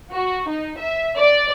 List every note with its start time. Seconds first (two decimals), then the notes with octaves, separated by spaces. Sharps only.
0.12 F#4
0.49 D#4
0.79 E5
1.17 D5